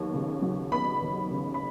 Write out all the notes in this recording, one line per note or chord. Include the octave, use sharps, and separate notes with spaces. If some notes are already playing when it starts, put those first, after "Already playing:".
Already playing: D#2 F#3 B3
C#3
F#3
B3 B5
D#2
C#3
B5